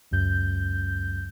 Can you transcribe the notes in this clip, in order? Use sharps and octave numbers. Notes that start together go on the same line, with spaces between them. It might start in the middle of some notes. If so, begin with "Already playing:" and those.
C#2 F#2 G6